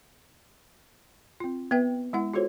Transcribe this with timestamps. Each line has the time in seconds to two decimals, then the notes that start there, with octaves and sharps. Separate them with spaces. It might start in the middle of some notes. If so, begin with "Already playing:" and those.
1.40 C4 F4
1.71 B3 B4 E5 G5
2.13 G#3 E4 F#5
2.33 F4 F#4 G#4 A4 C5 C#5